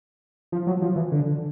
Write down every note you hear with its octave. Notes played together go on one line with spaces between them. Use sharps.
F3
F#3
F3
E3
D3